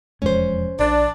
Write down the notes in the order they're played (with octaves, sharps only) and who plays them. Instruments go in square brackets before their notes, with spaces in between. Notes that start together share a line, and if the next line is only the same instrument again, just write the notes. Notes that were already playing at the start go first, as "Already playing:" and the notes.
[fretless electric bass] E1 F2 G#3 [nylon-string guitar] C#4 C5
[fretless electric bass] A#1 [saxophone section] D4